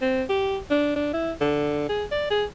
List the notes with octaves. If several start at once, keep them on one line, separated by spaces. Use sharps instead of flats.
C4
G4
D4
D4
E4
D3
G#4
D5
G#4